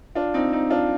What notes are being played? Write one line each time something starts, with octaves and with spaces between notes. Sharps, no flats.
D4 F4
C4 D#4
C4 D#4
D4 F4